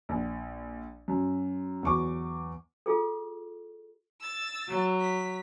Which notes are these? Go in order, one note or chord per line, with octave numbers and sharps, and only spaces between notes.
A#1
F#2
E2 F#3 C#6 D6
F4 G#4 A4
E6 A6
F#3
B6